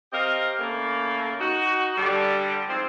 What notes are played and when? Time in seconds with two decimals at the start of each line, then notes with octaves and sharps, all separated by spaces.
0.13 C4 G4 A#4 D#5 F5
0.60 C#3 A3 A#3
1.39 D#4 F#4
1.97 D3 G3
2.69 G#2 F3 C4